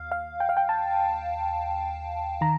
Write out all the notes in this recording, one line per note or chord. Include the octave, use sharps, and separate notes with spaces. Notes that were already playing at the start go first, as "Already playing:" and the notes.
Already playing: D#2 F5
F5
G5
F5
G5
A5
D#3 A#5